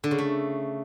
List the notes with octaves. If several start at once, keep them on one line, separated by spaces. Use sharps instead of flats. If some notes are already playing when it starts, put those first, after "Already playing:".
D3
C#3
A3